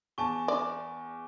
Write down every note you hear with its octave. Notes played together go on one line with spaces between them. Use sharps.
E2 G#5 A5 C#6
D5